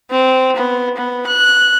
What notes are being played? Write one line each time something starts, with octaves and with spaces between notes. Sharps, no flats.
C4
B3
B3
F#6